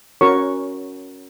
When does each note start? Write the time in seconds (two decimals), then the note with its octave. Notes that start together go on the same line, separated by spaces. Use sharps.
0.21 C#4 F#4 A#4 C#5 C#6